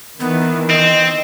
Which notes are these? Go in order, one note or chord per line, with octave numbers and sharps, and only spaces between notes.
D#3 E3 B3
C4 D#5